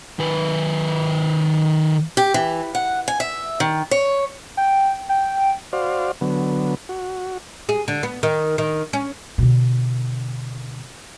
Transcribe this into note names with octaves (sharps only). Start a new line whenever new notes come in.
D#3 B4
G4
E3
F#5
G#5
E5
D#3
C#5
G5
G5
F#4 C5 D5 F5
D3 F#3 B3
F#4
G#4
D3
B3
D#3
D#3
C#4
B2 D3